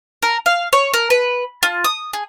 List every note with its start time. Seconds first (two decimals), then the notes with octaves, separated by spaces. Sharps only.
0.22 A#4
0.46 F5
0.73 C#5
0.93 A#4
1.10 B4
1.63 F4
1.84 D#6
2.13 G#4